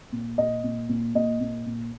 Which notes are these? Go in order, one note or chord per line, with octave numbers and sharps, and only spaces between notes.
A#2
A#2 D#5
A#2
A#2
A#2 D#5
A#2
A#2